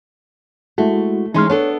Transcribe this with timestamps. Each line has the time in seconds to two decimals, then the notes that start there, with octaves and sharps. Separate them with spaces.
0.78 G#3 A3 E4 F#4
1.34 E3 G#3 C#4 D#4 C6 F6
1.50 B3 D4 A4 C#5